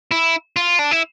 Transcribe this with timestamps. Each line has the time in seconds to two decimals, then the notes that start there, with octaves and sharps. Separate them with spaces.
0.11 E4
0.56 F4
0.79 D4
0.91 E4